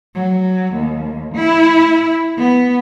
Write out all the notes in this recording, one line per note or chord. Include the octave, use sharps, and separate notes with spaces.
F#3
D#2
E4
B3